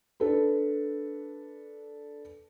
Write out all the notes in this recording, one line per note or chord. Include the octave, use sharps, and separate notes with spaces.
D4 A4 B4